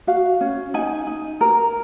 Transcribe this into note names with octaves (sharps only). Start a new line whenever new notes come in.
F#4 F5
C#4
D#4 G#5
D#4
A#4